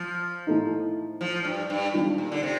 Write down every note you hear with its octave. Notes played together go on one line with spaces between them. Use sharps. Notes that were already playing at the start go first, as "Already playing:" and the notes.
Already playing: F3
A2 A3 D#4
F3
G2
G2
D#3 G3 D4
A#2
D3
C3